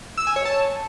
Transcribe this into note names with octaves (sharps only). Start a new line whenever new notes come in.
E6
G#5
C#5
A5